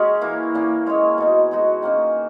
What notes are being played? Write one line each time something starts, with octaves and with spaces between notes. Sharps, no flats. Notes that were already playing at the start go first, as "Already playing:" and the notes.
Already playing: G#3 C#4 F#4 G#4 A#4
E3 A#3 E4
A#2 A#3 C#4
G#3 C#4 G#4 C#5
B2 G#3 D#4
G#3 B3 D#4 F#4
D#3 A#3 C#4 G#4